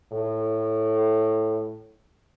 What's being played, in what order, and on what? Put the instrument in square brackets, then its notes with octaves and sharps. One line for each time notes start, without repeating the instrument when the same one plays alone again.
[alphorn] A2